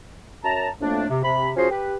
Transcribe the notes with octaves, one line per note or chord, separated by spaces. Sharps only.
F#2 A5 A#5
F2 A2 A3 A#3 D4
C3
C3 B5
F3 C#4 F4 F#4 G#4 C5
G4 B4